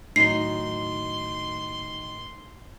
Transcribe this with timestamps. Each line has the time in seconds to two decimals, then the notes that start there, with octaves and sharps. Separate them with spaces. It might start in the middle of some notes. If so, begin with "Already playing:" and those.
0.16 A2 D#3 F#3 D#4 C6 C7